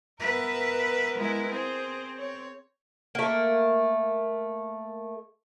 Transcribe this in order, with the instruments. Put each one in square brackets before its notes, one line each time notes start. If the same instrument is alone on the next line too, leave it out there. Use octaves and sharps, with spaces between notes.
[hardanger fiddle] B3 A#4 [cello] B4 E5
[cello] G#3 E4
[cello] C4 [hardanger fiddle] G#4 C5
[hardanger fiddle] C#5
[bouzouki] A3 A#3